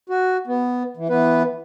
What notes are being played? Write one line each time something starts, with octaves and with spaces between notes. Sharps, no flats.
F#4
B3
E3
E3 B3 B4